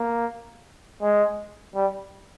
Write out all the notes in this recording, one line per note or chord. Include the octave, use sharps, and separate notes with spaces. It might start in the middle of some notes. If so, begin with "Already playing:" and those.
Already playing: A#3
G#3
G3